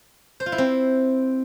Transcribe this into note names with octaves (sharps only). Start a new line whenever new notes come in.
C5
F4
E4
C4